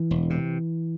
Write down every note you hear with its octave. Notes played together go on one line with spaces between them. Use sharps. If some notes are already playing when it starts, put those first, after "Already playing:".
Already playing: E3
E1
C3